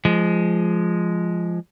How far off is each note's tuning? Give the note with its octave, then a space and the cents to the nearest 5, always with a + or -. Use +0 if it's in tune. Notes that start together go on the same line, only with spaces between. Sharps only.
F3 -15 G#3 +0